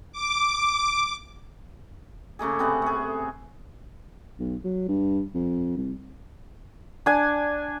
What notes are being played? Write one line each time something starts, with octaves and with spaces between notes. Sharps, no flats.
D6
C#3 A3 A#3 G#4
C3 B3 F#5
A3 G#4
B1
F#3
G2
F2
C2
D4 G#5